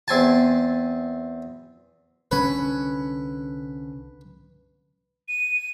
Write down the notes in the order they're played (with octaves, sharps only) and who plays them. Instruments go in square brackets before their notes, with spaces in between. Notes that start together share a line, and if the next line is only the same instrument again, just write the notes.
[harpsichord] E2 C4 G#5 A5
[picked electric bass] C2 D3 C#4 [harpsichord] B4
[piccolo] D#7